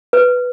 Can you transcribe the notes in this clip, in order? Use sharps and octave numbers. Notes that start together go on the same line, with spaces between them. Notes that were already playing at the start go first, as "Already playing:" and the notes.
B4